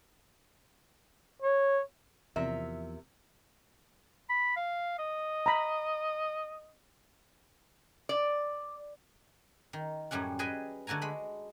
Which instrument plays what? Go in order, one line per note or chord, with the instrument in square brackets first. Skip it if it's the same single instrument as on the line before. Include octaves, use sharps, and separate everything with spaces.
[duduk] C#5
[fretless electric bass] E2 F3 [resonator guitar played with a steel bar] C3 A#4 E5
[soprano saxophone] B5
F5
D#5
[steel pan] A#5 B5
[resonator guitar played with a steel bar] D5
[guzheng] D#3
F#2 A2 G3 C#4 F#5
G#4 B4 D#5 G5 G#5
D3 A3 F#4 G#5 A#5
G#3 B5